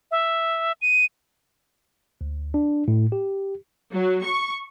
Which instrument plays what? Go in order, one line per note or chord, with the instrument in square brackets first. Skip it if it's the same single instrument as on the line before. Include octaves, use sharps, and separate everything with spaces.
[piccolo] E5
D#7
[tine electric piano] D2
D4
A2
G4
[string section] F#3
C#6